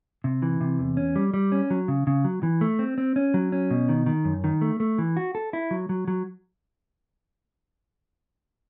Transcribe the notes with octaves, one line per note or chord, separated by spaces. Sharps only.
C3
E3
C3
E2
C#4
G3
G3
C#4
F#3
C#3
C#3
F#3
E3
A3
C4
C4
C#4
F#3
C#4
B2
D#3
D#3
F#2
D#3
A3
A3
E3
F#4
A4
E4
F#3
F#3
F#3